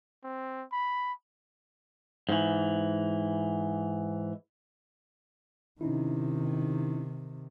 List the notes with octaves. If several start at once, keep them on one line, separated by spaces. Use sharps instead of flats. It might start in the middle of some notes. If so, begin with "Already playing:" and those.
C4
B5
G#2 E3
C3 D#3 C#4 D#4 E4